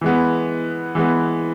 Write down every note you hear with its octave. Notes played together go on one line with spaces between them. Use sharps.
E3 G#3 B3
E3 G#3 B3